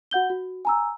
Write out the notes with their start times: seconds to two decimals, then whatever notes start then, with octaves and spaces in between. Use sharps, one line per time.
0.11 F#4 F#5 G6 G7
0.30 F#4
0.65 G#5 A#5 E6